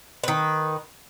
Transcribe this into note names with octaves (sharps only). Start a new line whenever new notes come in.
D#3 B4